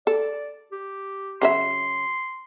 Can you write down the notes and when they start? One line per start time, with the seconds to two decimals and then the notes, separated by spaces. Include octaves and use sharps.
0.07 A4 D5
0.72 G4
1.42 C#3 F#3 E5 C6